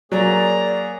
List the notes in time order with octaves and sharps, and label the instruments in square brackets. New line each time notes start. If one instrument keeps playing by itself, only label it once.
[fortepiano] F#3 [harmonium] A#3 G#4 C#5 [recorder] D5 [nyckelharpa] A#5